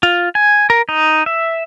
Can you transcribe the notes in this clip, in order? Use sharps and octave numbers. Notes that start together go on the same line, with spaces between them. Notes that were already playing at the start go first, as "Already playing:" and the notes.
F4
G#5
A#4
D#4
E5